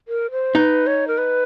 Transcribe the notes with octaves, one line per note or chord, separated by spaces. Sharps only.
A#4
C5
D#4 B4
C#5
A#4
B4